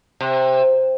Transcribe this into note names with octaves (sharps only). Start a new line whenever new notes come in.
C3